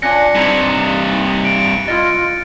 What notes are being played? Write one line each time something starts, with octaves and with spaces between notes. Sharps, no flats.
C#4 D4 F4 G#5 F#6 A#6 C#7
G2 C3 G3 D#4 E4 A#5
D7
E4 F4 D#5 A6